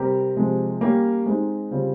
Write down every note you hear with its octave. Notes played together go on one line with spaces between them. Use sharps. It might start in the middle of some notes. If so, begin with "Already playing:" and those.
Already playing: C3 G3 C4 G4 A#4
C3 F3 G#3
G3 A#3 C#4 G4
G#3 C4 D#4
C#3 G3 C4 F4